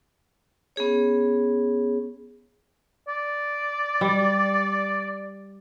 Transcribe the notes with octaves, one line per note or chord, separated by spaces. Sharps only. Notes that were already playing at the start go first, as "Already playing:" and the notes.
B3 C#4 G#4 C#5
D5
G3